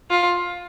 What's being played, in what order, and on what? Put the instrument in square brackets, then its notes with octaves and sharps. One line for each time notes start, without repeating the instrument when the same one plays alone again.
[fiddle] F4